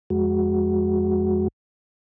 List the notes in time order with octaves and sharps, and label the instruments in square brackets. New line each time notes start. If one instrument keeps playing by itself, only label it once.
[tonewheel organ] F2 G#3 F#4